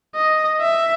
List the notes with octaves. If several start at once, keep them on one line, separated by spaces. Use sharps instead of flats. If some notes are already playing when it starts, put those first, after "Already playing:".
D#5
E5